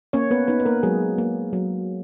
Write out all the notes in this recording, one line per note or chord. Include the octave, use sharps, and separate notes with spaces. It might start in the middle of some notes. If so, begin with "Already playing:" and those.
A#3 C#4 C#5
B3 B4
B3 D#4 B4
B4
A#3 A#4
F#3 G#3 G#4
A#3
F#3